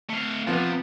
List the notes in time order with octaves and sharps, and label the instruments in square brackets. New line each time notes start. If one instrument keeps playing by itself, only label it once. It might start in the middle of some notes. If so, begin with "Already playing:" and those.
[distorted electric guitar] A3 F5
[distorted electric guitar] C3 [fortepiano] F3 B3